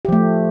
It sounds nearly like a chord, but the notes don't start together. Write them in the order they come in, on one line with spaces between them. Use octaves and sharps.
G4 F3 A3